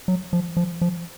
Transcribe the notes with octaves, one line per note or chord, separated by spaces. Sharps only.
F#3
F3
F3
F3